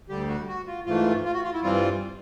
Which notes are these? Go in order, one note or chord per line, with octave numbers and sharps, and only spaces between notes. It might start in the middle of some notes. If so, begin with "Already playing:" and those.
D2 D3 G3 G4
F#4
F#4
F4
G#2 E3 A3 F4
F4
F#4
F4
E4
G2 E3 G3 C4 F4